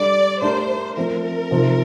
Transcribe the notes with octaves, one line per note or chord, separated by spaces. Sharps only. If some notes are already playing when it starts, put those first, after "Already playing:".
Already playing: G3 D4 A4 D5
A3 D4 G4 A#4 C5
F3 A3 C4 A#4
C3 F3 C4 D#4